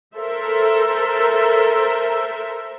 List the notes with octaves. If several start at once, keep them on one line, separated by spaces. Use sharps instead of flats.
A4 A#4 C5 E5